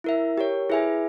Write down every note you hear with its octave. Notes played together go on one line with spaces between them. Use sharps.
E4 A#4 E5
G4 A#4 C#5
E4 G#4 B4 E5 G#5